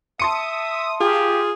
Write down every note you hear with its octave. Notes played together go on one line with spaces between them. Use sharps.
E5 A5 C6 D#6 C#7
F4 G4 G#4